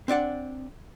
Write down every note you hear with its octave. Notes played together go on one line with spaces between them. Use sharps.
C4 D4 D5 F#5